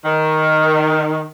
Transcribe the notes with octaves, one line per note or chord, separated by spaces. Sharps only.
D#3